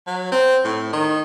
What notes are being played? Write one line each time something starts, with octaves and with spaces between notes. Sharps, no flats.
F#3
C4
A2
D#3